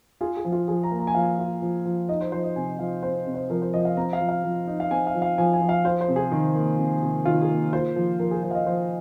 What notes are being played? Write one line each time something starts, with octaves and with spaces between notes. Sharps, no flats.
F4 G#4
G#4
F3
F4
F3 G#4
A#5
A#3
A#5
G#5
F3 F5
G#5
F4
F3
F3
D#4 D#5
C5
F3 C5
D#5
C3 G#5
F3 F5
C4 C5
C3
C5
F3 A#4
C5
F3 D#5
F5
C4 A#5
F5
F3
F5
F3
D#4
F5
C4 G#5
F5
F3
F5
F3 G#5
G#5
F3
F5
F4 C5
C5
C3
G#4
D#3
A#3
C3
C3
D#3 F4
G#4
A#3
F4 C5
F3
F3 A#4
G#4
F3 C5
F5
D#5
F3 C5